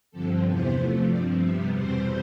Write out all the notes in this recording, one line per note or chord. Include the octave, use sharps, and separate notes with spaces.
G2 D3 F3 C4 A4
E2 C3 E3 B3 C5
C3 F3 A3
G2 F3 C4 D5
C3 G3 B3 E5
E2 B2 G3 C4 C5